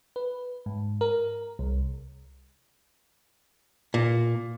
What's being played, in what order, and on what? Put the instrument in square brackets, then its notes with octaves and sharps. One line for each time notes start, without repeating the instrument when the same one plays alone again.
[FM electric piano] B4
G#2
A#4
C2
[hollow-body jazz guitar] A#2